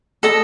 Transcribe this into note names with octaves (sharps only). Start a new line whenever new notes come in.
A4 D#5 A5